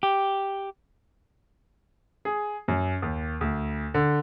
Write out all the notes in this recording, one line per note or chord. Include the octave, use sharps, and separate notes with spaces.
G4
G#4
F#2
D#2
D2
D3